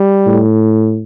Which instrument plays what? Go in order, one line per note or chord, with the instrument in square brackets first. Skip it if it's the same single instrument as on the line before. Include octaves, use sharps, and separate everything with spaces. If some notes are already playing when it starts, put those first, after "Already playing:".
Already playing: [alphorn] G3
[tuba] A2